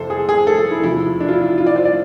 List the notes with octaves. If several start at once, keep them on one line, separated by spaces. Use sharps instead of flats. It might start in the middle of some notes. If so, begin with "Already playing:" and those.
Already playing: F2 C3 E3 A4 C5
G#4
G#4
A4
A4
E4
E2 C3 F3 E4
D4
F4
E4
E4
F4
D5
C5
D5